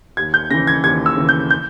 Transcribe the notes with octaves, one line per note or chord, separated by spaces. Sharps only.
D#2 G#6
G6
C#3 E3 A#6
G#6
D#2 G#6
E6
C#3 E3
G6
G6